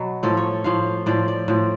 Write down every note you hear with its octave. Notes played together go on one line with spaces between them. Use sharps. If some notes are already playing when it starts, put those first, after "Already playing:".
Already playing: B2 F#3
A2 F3 A4
C#5
A2 F3 F5
A2 F3 D5
D5
A2 F3